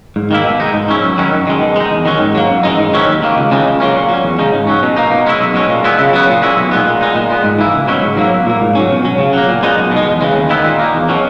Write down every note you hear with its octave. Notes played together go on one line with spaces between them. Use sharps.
G#2
D#3 A#3 E4
B2
G#3 D#4
G#2
F#3 C#4 E4
F#2
D#3 F#3 C#4 E4
F#2
D#3 G#3
B2
G#3 D#4
E2
D#3 F#3 C#4
G#2
F#3 A#3
F#2
E3 G#3 D#4
G#2
D#3 F#3 C#4 E4
D#2
D#3 A#3
C#2
C#3 E3 G#3 D#4
C#2
C#3 F#3 A#3 C#4
A#2
F#3
C#4
E2
C#3 G#3 D#4
G#2
F#3 C#4
B2
A#3 D#4
B2
G#3 C#4 E4
B1
B2 G#3 C#4
A#2
G#3 B3 E4
C#3
F#3 B3
A#2
G#3 C#4 E4
B1
A#2 G#3 B3
A#2
G#3 D#4
A#2
G#3 B3
G#2
E3 A#3 E4
C#2
B2 F#3 C#4 E4
G#2
F#3 A#3 E4
B1
A#2 A#3
G#2
F#3 C#4
B2
F#3 C#4
C#3
F#3 A#3
A#2
G#3 B3 D#4
B1
B2 G#3
E2
C#3 E3 G#3
D#2
D#3 G#3 B3 E4
A#2
A#3 D#4
E2
B2 F#3 C#4